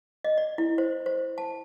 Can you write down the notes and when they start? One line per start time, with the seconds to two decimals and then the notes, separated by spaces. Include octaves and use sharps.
0.24 D#5
0.38 D5
0.58 E4
0.78 C5
1.06 C5
1.38 A5